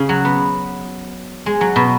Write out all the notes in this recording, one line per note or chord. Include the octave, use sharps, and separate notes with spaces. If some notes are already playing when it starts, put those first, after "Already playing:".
Already playing: C#3
F#3
B3
G#3
F#3
B2